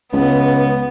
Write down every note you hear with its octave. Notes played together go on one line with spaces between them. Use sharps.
C#2 B3